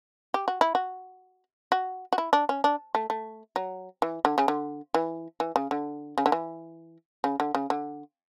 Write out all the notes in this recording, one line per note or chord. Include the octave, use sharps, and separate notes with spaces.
G4
F#4
E4
F#4
F#4
F#4
E4
D4
C#4
D4
A3
A3
F#3
E3
D3
C#3
D3
E3
E3
C#3
D3
C#3
D3
E3
C#3
D3
C#3
D3